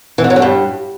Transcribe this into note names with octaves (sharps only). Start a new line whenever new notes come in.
E3
D3
F#3
D3
G2